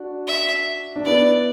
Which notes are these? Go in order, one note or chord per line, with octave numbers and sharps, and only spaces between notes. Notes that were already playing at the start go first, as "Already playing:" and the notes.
Already playing: D4 F#4
E5
D4
B3 E4 D5